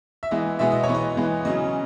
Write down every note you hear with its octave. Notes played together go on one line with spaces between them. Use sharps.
E5
E3 G#3 B3 D#5
B2 G#3 B3 E5
D#5
C#5
E3 B3
D#5
E3 G#3 B3
C#3 F#3 C#4 D#5